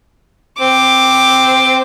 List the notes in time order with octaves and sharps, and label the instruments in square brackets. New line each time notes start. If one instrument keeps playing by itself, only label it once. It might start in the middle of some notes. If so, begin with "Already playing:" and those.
[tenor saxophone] C4 [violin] D6